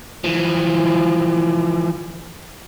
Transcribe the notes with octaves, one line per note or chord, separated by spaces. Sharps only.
E3 F3